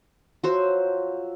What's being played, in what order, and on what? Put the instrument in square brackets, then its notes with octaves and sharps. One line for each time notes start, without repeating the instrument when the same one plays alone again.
[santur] F3 F#3 E5 [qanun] F#4 C5